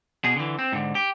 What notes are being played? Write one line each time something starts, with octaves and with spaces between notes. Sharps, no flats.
B2 G#4
D3 E3
C4
G#2 D3
G4